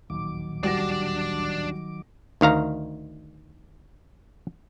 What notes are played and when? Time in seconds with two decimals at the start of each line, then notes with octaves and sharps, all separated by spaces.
0.10 D1 A#1 D#2 D#3 F#3 D6
0.63 G3 D4 F#4 D5 A#6
2.41 D2 D#3 F5 A#5